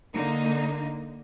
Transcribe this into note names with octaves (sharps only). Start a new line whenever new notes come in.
D3 A#3 D#4